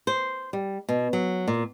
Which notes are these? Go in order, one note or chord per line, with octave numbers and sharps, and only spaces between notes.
C5
G3
B2
F#3
A#2